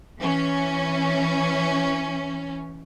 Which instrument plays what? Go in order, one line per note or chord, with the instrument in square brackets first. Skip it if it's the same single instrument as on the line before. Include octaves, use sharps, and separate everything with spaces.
[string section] E3 C#4